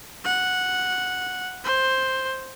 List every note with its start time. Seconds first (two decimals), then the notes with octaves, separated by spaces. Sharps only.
0.25 F#5
1.64 C5